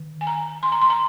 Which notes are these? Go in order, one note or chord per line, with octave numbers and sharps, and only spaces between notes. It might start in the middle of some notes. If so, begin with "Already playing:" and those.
Already playing: D#3
G#5
A#5
C6
A#5
C6
A#5